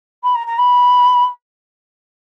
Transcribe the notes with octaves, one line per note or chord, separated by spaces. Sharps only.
B5
A#5
A#5
B5